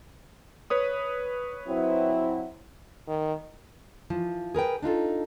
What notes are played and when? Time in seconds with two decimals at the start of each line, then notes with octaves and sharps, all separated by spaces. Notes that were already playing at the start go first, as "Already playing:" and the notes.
0.70 B4 C#5 D#6
1.67 F#3 C4 E4
3.08 D#3
4.10 E3 F3
4.55 G#4 A#4 B4 G5
4.82 D4 D#4 F4 A4